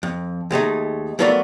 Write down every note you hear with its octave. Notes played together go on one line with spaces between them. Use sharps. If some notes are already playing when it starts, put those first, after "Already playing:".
F2
D#2 G#3 A3 D#4
F#3 A3 B3 F4 A#4 D5